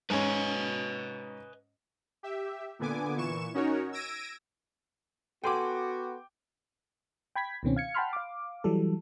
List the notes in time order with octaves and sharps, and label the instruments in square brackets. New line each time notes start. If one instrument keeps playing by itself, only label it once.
[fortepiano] G#2 C#4 [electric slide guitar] B4 D#5 G#5
[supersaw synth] G4 E5
A#2 D3 B3 G#5 D6
A#2 E3 C#6 E7
C#4 D#4 F#4 A#4 C#5
E6 G#6 A#6 D7 D#7
[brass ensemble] B3 F#4 [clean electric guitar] A4 G#5 C6 [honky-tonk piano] G5 D6
[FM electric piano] G5 B5 G#6 B6
C#2 B2 D#3 C4 C#4
F5 G#6 C#7
F#5 G5 A5 B5 C6 F6
F5 D6
E3 F#3 G3 A4